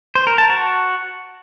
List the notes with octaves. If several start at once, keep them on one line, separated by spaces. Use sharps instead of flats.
C5
A#4
A5
F#4